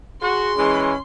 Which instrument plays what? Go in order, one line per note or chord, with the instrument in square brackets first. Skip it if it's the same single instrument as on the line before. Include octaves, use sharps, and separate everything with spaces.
[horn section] F#4 [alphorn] G#4 [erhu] C6
[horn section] E3 G#3 [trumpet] C#4